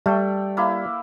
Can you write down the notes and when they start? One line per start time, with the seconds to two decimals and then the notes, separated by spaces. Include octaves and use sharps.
0.06 G3 A3 G5
0.57 A#3 E4